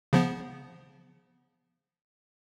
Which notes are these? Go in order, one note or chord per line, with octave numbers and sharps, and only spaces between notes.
C#3 F3 B3